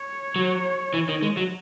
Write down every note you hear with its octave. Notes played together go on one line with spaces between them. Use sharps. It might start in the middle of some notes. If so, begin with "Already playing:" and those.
Already playing: C#5
F#3
E3
D#3
G#3
F#3